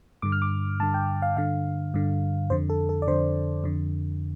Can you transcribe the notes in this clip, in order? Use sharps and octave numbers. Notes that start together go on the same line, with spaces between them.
G2 D3 D6
F6
D6
G2 D3 A5
G5
F5
G2 D3 F5
G2 D3
F2 D3 C5
A4
A4
D5
F2 D3 C5
F2 D3